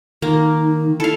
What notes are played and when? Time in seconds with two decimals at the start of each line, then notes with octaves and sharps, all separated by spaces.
0.22 D#3 A#3 D#4
1.00 E4 A4 F5